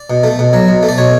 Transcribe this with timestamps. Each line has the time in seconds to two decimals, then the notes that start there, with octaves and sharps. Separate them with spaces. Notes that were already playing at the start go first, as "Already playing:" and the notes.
Already playing: D5
0.10 B2
0.23 A3
0.39 B2
0.53 F#3
0.68 B2
0.83 A3
0.89 D5
0.98 B2 C#5